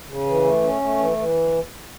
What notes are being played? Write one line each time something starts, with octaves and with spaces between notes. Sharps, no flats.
C#3
E3
A3
C#4
A3
E3
E3